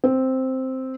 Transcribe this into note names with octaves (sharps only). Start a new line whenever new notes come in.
C4